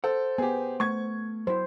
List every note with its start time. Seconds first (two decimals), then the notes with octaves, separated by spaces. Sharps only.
0.04 A4 C5 F#5
0.38 B3 G4 G#4
0.80 A3 C#6 G#6
1.47 F#3 E4 C5